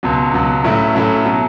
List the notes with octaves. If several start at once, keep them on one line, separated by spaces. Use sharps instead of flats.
C#2 B2 F#3
C#2 B2 F#3
A2 F#3 A3 C#4 E4
A2 F#3 A3 C#4 E4
B2 F#3